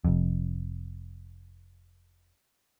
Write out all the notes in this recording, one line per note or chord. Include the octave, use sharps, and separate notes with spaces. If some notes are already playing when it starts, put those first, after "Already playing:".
F1 F2